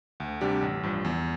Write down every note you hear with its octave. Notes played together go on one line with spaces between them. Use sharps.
D2
C3 G3 D4 G4
A1
G2 F3
E2